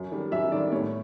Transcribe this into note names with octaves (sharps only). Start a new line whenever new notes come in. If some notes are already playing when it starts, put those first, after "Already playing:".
Already playing: F#2
D#3 G3
F#2 E5
D#3 G3 D5
A2 C#5